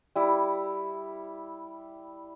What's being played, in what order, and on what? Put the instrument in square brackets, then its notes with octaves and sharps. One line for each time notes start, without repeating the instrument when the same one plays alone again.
[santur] G3 E4